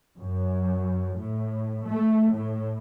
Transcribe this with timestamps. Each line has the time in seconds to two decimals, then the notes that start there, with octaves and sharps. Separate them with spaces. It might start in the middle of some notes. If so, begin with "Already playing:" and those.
0.19 F#2
1.17 A2
1.86 A3
2.30 A2